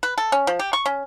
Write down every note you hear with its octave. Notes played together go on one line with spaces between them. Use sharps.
B4
A4
C#4
F3
G4
C#6
C#4